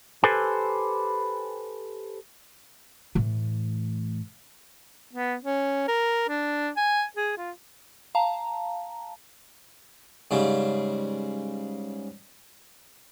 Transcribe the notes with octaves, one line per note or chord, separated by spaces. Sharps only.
G4 A4 B4 C5 G#5
A2 E3
B3
C#4
A#4
D4
G#5
G#4
F4
F5 A5 A#5
G#2 C#3 G3